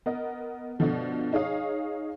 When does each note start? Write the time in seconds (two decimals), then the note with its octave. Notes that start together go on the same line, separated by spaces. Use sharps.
0.06 B3 A#4 D#5
0.79 G2 B2 D3 F3 A3
1.33 D#4 G#4 C#5 F5